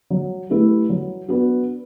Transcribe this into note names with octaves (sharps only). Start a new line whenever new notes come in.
F#3
A3 E4 G4 B4
F#3
B3 D4 F#4